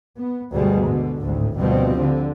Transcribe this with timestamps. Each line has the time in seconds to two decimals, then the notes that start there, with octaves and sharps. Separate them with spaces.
0.18 B3
0.53 D2 G2 B2 G3 G#3 B3
0.84 B2 D3
1.22 G#1 D2 A2
1.57 D2 B2 F3 G3 C4
1.98 D3